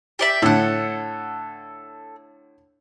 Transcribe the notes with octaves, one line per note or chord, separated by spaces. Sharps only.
G4 D5 E5
A2 D3 A4 F#5